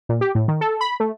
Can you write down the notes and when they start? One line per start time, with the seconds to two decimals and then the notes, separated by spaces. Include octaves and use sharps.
0.09 A#2
0.21 G4
0.35 A2
0.48 D#3
0.61 A4
0.81 B5
1.00 A3